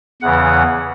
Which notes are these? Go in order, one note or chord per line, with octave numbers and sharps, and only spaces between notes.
E2 C#3 E3 F#5